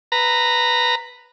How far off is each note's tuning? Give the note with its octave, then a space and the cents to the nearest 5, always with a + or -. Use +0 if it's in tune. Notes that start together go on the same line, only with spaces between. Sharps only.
B4 +0 A#5 -10